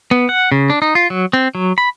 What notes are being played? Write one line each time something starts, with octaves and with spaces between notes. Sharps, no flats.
B3
F#5
C#3
D4
D#4
F4
F#3
C4
F#3
B5